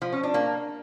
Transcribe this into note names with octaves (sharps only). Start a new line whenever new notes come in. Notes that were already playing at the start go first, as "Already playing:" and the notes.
F3
C#4
D4
A#3